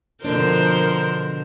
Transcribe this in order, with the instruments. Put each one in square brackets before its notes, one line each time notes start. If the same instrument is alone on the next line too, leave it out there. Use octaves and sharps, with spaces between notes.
[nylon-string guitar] B2 D3 D4 [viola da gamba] F3 A#4 C5